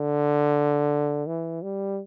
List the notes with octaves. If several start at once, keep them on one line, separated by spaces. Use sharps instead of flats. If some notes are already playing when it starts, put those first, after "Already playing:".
Already playing: D3
E3
G3